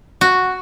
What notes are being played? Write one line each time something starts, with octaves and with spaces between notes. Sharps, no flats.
F#4